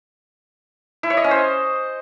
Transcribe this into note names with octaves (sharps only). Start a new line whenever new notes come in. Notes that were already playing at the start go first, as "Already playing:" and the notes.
E4
C#5
D#5
C#4
C5